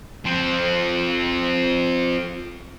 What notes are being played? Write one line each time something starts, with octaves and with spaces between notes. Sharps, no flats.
F3 C4